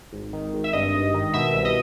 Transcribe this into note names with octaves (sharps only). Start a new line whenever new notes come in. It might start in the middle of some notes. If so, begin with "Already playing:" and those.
G#1
D#3
G#1
E5
G2 D#5
G#1
D#3
B2 E5
C2
D#5